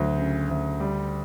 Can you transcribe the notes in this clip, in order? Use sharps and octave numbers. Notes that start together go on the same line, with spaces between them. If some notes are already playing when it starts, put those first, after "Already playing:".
Already playing: D2 F#3
C#3
D2
G3